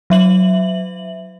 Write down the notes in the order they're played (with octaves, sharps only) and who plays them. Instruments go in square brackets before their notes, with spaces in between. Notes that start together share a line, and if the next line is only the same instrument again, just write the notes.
[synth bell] F#3 E5 F#7